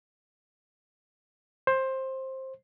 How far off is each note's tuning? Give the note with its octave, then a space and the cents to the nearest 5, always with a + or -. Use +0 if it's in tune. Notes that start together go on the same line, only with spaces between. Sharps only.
C5 +15